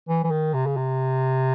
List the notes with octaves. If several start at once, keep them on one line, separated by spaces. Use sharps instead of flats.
E3
E3
D#3
C3
C#3
C3